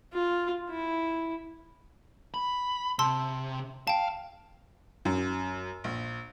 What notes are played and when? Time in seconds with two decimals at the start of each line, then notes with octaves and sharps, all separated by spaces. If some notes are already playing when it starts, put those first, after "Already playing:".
0.13 F4
0.70 E4
2.34 B5
2.99 C3 A5 C6 E6
3.87 F5 G5 A5
5.05 F#2
5.84 A#1